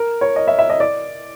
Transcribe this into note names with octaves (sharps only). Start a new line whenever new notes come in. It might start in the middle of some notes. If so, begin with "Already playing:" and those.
Already playing: A#4
C#5
D#5
E5
E5
D#5
D5